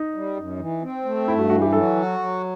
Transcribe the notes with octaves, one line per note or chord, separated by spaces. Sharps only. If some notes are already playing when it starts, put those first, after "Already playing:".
Already playing: D#4
G3
F#2
E3
C4
A3
G2 E4
F#4
E3 F#4
G4
F#3 A4
F#4
F#3